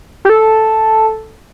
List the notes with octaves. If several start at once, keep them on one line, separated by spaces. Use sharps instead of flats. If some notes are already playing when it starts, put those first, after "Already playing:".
G4
A4